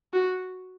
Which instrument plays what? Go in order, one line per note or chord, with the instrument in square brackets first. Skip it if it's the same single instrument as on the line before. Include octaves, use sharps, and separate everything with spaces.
[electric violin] F#4